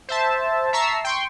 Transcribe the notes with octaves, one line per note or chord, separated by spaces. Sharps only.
C5 E5 A5
E5 A5 A#5 C#6 E6 C7
G5 C6 C#6